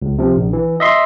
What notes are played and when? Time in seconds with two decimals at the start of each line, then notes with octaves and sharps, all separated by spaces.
0.02 C#2
0.18 C3 F3
0.36 A#1
0.53 E3
0.80 D#5 E5 C6